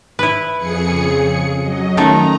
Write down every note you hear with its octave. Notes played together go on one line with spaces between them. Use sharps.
E4 B4
F2 G#4 C#7
C#3
F#3 D#5
D#3 A3 C#4 A4 A#5